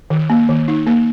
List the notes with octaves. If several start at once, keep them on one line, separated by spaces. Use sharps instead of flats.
D#3
A#3
D#3
D#4
A#3